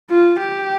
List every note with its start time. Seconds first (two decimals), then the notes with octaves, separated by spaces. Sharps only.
0.10 F4
0.39 G4